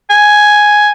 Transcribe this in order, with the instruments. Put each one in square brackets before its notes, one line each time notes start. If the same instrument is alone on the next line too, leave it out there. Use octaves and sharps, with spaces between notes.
[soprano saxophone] G#5